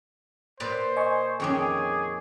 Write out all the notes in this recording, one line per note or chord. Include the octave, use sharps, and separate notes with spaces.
A#2 B4 C5 D5
D#5 G#5 C#6
F2 D#3 C#4 G#4 C#6 D6